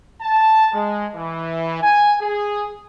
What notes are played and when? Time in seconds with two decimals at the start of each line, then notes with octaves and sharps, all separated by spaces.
0.22 A5
0.74 G#3
1.16 E3
1.83 G#5
2.22 G#4